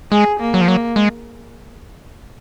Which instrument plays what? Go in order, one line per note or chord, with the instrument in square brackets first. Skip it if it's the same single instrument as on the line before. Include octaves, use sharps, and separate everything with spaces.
[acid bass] G#3 [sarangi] G#4
[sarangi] A#3
[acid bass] F#3
F3
[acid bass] F#3 [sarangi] A#3
[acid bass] G#3